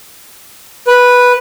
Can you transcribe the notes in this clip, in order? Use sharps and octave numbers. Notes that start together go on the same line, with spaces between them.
B4